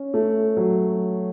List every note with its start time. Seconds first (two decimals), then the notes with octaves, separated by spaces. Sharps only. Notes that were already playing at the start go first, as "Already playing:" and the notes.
Already playing: C#4
0.14 A3
0.57 F#3